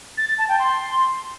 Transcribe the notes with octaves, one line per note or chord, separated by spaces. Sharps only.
A6
A6
A5
G5
C6